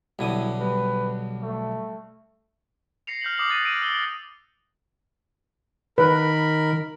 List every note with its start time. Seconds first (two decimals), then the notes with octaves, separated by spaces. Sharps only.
0.19 B1 D3 G3 E4 D#6
0.61 G3 B4
1.42 A3
3.07 A#6 C7 C#7 F7
3.21 F6 G6 B6 F#7
3.38 D6 D#6 F6 G6 C7 F#7
3.49 F#6 A6 A#6 D#7
3.65 E6 A#6 D7 D#7
3.82 E6 F6 D7 F#7 G7
5.98 D#3 A#4 B4 B5